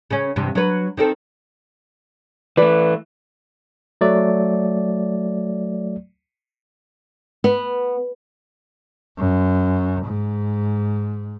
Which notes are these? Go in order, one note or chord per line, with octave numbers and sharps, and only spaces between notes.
C#3 C#4
E2 G2 C3
F#3 B4
D#3 C4 A4
E3 A3 B4 D5
F#3 A3 D5
B3
F#2
G#2